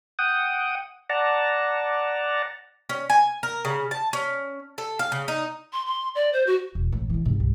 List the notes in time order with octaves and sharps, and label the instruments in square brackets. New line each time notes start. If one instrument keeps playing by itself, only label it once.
[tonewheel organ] F#5 G5 D#6
D5 F#5 A5 A#5
[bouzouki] C#4
G#5
A#4
C#3
A5
C#4
A4
F5
C#3
D#4
[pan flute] C6
C6
D5
C5
F#4
[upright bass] E1
A1 A2
C#3 E3
G#2 C3
C2 G2